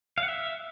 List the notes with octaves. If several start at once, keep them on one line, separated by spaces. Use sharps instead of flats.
F5
F#5
E5